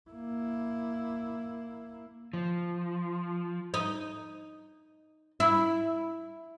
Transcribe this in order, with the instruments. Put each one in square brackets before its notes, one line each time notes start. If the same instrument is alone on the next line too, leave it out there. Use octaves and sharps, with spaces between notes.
[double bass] A#3 E4
[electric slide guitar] F3
[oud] D#4
E4